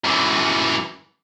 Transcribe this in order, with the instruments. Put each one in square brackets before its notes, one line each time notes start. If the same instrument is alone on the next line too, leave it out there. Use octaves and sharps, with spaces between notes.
[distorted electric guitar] F#2 E3